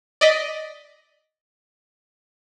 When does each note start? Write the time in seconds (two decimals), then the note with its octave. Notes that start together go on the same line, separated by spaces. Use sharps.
0.21 D5 D#5 B6